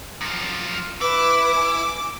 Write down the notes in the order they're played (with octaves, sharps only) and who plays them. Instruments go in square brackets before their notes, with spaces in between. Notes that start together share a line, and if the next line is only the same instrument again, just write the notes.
[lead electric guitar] F#2 F3
[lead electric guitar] E4 [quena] B4 [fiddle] D6
[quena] G#5